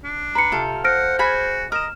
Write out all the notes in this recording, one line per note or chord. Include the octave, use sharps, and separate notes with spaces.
D4
B4 A#5 C#7
C3 F4 A4 G5 F6
C5 F#5 F6 A#6 D7
F#4 G#4 G#5 B5
A#4 D#5 F6 E7